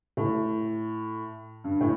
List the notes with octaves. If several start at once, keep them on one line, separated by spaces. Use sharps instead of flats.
A2
G2
A2